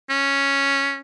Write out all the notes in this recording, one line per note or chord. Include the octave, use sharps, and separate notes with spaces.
C#4